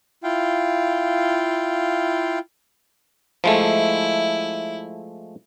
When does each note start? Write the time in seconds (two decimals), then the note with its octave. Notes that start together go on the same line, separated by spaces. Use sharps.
0.24 E4 F4 F5 G5
3.44 F3 G#3 A3 E4